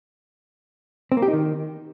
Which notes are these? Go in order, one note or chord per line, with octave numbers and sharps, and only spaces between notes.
C4
A#3
G4
D#4
D#3